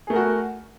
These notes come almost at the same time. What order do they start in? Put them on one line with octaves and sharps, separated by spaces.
G#4 A3 A#4 F#4